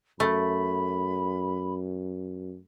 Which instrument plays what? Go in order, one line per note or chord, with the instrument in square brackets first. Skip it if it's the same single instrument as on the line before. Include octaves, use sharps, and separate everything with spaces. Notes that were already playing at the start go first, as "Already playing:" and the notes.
[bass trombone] F#2 [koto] A3 [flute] B5